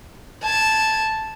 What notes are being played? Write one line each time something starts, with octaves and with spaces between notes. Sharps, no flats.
A5 G#6